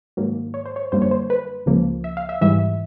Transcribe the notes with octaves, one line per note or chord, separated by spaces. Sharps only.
G#2 D#3 F#3 A#3
C#5
C5
C#5
F#2 D3 G3 A#3 C5
C#5
C5
B4
C#2 C#3 F3 A#3
E5
F5
E5
G#2 E3 G3 E5